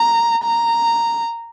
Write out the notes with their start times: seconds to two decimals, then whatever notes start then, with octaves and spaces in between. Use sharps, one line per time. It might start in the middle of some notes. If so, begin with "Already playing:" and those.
Already playing: A#5
0.44 A#5